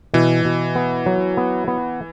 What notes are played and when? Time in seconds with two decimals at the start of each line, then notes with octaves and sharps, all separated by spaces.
0.14 B2 E3
0.45 B2
0.76 B3
1.06 F#3
1.37 B3
1.68 B3